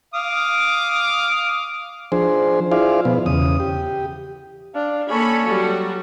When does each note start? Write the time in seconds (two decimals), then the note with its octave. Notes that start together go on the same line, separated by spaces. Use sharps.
0.14 F5 D6 D#6
2.12 F3 D4 G#4 C5
2.71 E4 F4 G#4 C5 D5 F5
3.05 B2 F3 B3
3.26 E2 C#3 D#6
3.60 G4
4.75 D4 F5
5.10 A#3 C#4 A4 C#5 B5
5.46 F#3 G3 F#4